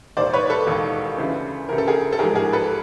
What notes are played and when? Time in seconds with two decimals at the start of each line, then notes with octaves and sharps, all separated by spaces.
0.17 E1 D#2 D#3 C5 D5
0.33 B4 C#5
0.50 A4 B4
0.67 E1 D#2 D#3
1.18 D2 C#3 E3
1.68 D2 C#3 E3 A#4
1.78 A4
1.87 G#4 A#4
2.12 A4
2.19 A1 G#2 F3 G#3 G#4 A#4
2.36 G#4 A#4
2.53 A4 B4